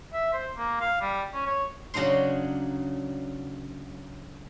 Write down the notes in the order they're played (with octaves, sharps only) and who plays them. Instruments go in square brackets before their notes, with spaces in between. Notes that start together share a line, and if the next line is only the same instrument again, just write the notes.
[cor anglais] E5
C5
A#3
F5
G3
C#4
C#5
[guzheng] C#3 F#3 D4 D#4 C6